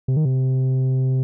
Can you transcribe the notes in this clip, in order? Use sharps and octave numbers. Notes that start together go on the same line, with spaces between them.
C3
D#3
C3